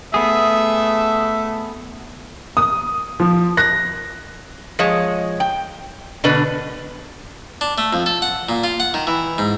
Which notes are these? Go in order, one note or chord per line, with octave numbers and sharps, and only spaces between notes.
A3 B3 G#4 E5
D#6
F3
F#6 A#6
F3 G#3 C#5
G5
B2 D3 D4 B4
D4
A3
F2
A4
F#5
A#2
F4
F#5
D#3
E3
G#2